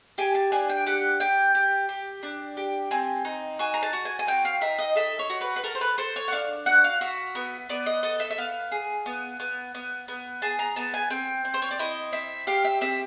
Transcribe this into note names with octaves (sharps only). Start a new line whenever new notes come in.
G4 G#5
A5
D4 G#5
G5
G4 F#5
G4 G5
G4
G4
D4
G4
C4 G#5
D#4
F#4 G#5
A#5
A5
F#4
G#5
G#5
C4 G5
F5
D#4 E5
D#5
A4 E5
C#5
F#4
B4
B4
A4 A#4
C5
B4
A4 C5
C#5
F#5
D4 F5
F#4 F#5
F5
F#4 E5
B3
B3 D5
D#5
A4 D#5
E5
E5
B3 F5
G#4
B3
B3
B3
B3
G#4 A5
A#5
B3 A5
G#5
C4 G5
C4
C5
C#5
D5
E4 D#5
C4 E5
G4 F5
E5
C4 E5